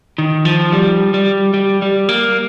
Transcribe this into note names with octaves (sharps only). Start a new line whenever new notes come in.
D#3
F3
G3
G3
G3
G3
A#3